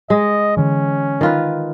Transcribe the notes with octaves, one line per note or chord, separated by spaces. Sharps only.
G#3 D#5
D3 E3 C#4
D#3 F4 B4